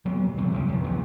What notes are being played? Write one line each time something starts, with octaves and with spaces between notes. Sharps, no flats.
F#3 A#3 B3
D#1
C3 F3 A3
F#1 C2 C#3
F1 D#2
A#1 E2